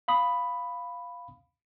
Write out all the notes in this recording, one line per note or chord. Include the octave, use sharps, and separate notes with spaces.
F5 B5 D#6